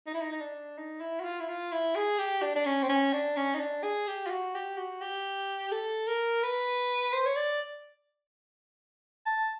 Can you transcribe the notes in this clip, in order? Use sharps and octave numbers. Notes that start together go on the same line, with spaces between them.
D#4
E4
D#4
D#4
D4
D#4
E4
F#4
F4
E4
F4
E4
G#4
G4
D4
D4
C#4
C4
C#4
D4
C#4
D#4
D4
G#4
G4
F4
F#4
G4
F#4
G4
A4
A#4
B4
C5
C#5
D5
A5